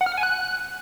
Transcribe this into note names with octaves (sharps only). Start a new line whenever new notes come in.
F#5
F6
F#5
G#5
F#6